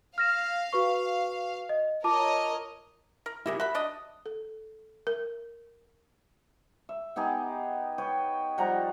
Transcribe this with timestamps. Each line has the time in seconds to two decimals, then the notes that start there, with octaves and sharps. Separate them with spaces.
0.18 F5 F6 A#6 E7
0.73 F#4 B4 C#6
1.69 D#5
2.04 F4 A#4 C#5 D#5 A5 D6
3.26 A#4
3.46 E4 G4 G#4 A#4 D#5 E5
3.60 F#4 E5 B5
3.74 F#3 D4 D#5
4.26 A4
5.07 A#4
6.89 E5
7.16 B3 D#4 G4 G#4
7.98 B4 C#5 G5
8.58 F3 G3 F#5 A#5